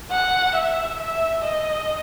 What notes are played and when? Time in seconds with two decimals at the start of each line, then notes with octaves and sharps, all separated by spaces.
0.11 F#5
0.55 E5
1.00 E5
1.44 D#5